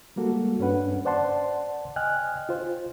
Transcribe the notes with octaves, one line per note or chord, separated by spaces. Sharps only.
G3 G#3 A#3 F#4 A4
G2 C#4 D4 B4 F#5
C5 D5 F#5 A5 C6
D#5 G5 G#5 F6 F#6
F4 C5